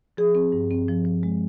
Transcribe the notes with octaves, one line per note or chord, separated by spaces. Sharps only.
F3 G#4
C4
G2
C4
F3
F3
G#3